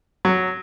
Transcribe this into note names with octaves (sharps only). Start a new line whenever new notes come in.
F#3